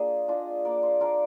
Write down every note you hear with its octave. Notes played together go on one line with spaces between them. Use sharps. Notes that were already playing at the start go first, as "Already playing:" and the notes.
Already playing: A#3 D4 F4 G#4
D4 F4 D#5
A#3 D5
C5
D4 F4 A#4